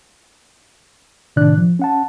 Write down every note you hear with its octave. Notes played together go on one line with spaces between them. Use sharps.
A2 C3 D#3 D4 D5 F#6
F3
C#4 F#5 A5